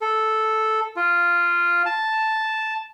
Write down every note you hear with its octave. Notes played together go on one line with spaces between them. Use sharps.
A4
F4
A5